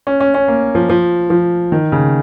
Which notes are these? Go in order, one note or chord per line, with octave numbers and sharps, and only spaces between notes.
C#4
C#4
C#4
A#3
F3
F3
F3
D#3
C#3